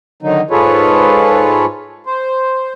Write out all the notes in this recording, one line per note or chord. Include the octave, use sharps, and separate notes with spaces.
D3 D#3 F#3 D#4
G#2 F4 G#4 A4 B4 C#5
C5